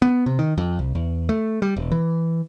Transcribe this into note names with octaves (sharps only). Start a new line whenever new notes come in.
B3
C3
D#3
F2
C2
E2
A3
G3
E1
E3